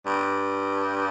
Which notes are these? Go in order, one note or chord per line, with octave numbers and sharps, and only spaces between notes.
G2